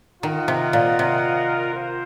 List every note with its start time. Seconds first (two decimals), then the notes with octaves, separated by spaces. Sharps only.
0.23 D#3 F4 A#4 D#5 F#5
0.48 C3
0.73 A#2
0.99 C3
1.74 F4 C5